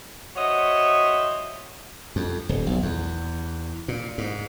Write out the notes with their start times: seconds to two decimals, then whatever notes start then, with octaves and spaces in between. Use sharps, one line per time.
0.37 F#4 C5 C#5 D#5 E5
2.16 F2
2.49 D#1
2.67 B1
2.83 E2
3.88 A#2
4.18 G#2